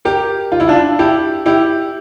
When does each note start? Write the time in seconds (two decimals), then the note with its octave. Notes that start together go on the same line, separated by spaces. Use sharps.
0.05 G4 A#4
0.52 F4
0.60 E4
0.68 D4 F4
0.99 E4 G4
1.46 E4 G4